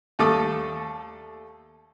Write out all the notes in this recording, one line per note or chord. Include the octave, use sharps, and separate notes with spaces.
D#2 G3 A3 A4 D6 D#6